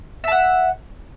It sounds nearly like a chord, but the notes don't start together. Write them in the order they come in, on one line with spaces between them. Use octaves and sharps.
E5 A5 F#5